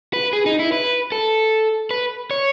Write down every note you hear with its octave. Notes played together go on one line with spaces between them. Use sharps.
B4
G#4
D#4
E4
B4
A4
B4
C#5